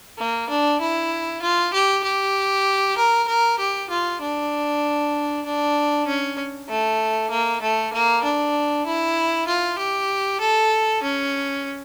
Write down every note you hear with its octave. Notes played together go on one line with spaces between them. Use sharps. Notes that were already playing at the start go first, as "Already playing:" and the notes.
A#3
D4
E4
F4
G4
G4
A#4
A#4
G4
F4
D4
D4
C#4
A3
A#3
A3
A#3
D4
E4
F4
G4
A4
C#4